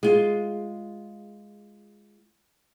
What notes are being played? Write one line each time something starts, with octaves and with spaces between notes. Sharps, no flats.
G#3 F4